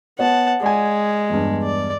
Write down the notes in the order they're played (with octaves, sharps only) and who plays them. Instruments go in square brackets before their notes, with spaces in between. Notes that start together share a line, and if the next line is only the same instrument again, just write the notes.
[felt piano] B3 C#5 [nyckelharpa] F#5 A5
[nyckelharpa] G#3 [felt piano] D5 G#5
[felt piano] E2 G2
[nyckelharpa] D5